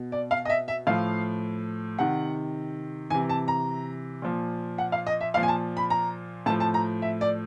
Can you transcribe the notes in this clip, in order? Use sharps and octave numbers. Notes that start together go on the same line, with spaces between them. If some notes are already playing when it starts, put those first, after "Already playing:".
Already playing: B2
D5
F5
D#5
E5
E5
A2 F3 F5
C3 D#3 F#5
C3 E3 G#5
A5
A#5
A#2 F3
F#5
F5
D#5
E5
A#2 F3 F5
G#5
A5
B5
A#5
A2 F3 A5
A5
A#5
E5
D5